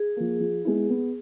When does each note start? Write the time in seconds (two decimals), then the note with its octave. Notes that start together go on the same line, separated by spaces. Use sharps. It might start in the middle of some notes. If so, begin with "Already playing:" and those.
Already playing: G#4
0.16 F3 A#3
0.40 F3
0.65 G#3 B3 E4
0.90 B3